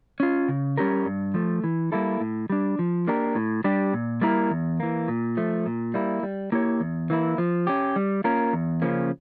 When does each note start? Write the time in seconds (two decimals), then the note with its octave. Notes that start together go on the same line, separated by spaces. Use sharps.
0.20 C#4 F4
0.48 C#3
0.78 G3 C#4 G4 A#4
1.05 G2
1.34 F3 A3
1.64 E3
1.92 G3 A#3 E4 A4
2.21 A2
2.50 G3 D4
2.79 F3
3.08 A#3 D4 G4 A#4
3.35 A2
3.64 G3 D4 G4
3.93 A#2
4.21 G3 A#3 E4 A#4
4.50 E2
4.80 E3 A#3
5.08 A#2
5.37 F3 A3
5.66 A#2
5.94 G3 A#3 E4
6.23 G3
6.52 A#3 E4 G4 C#5
6.80 E2
7.10 E3 A#3 E4
7.38 F3
7.67 C#4 G4
7.96 G3
8.24 A#3 C#4 F4 A#4
8.53 E2
8.82 C#3 F3 A#3 C#4